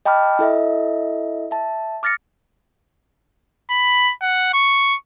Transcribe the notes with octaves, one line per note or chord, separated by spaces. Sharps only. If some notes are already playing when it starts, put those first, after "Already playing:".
D#5 G5 A5 B5 D6 F6
E4 A4 D#5 E5
E5 A5
D6 F6 A6 A#6 C#7
B5
F#5
C#6